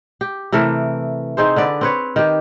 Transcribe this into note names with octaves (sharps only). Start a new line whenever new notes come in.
G4
C3 E3 A3 A#4
C4 D#4 G#4 C5
D3 B4 D5
C4 B4 C#5
D#3 G4